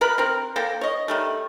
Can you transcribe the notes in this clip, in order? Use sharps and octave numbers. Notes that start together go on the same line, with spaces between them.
B2 A#4 B4 B5
C4 A#4
A#3 A4 G5 A#5
C#5 D#5
D#3 G3 A3